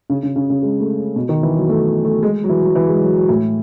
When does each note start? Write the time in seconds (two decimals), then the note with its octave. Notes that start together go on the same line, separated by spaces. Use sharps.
0.10 C#3
0.23 C#3
0.36 C#3
0.50 C#3
0.62 G#3
0.80 A3
1.16 B2
1.29 D#3
1.43 E3
1.56 F#3
1.69 A3
2.05 A3
2.23 G#3
2.44 F#3
2.49 E3
2.63 F#3
2.75 E3
2.89 G#3
3.03 F#3
3.16 F#3
3.29 A2